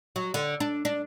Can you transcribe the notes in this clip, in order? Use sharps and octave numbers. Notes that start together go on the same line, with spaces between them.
F#3
D3
D4
D4